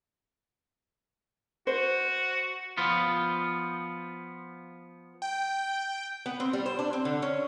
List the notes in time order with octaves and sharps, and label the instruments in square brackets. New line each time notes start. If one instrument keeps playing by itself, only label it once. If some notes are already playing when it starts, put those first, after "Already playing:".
[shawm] F#4 [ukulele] C5
[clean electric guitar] F3 B3 F4
[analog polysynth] G5
[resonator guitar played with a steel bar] B3
C4
G3
C5
D4
C4
D3
C#4